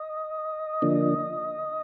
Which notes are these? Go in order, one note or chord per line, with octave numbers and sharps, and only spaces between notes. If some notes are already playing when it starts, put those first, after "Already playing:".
Already playing: D#5
D3 F3 A#3 D4